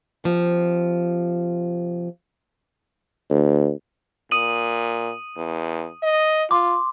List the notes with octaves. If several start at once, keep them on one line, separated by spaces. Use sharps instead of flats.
C3 F3
D2
A#2 D#6 D#7 F#7
E2
D#5
F4 C6 D6